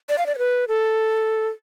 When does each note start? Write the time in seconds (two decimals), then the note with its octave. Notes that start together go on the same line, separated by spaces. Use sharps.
0.09 D5
0.18 F5
0.26 D5
0.35 C#5
0.38 B4
0.68 A4